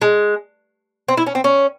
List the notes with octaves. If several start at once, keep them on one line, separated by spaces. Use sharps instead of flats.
G#3
C4
E4
C#4
C4
C#4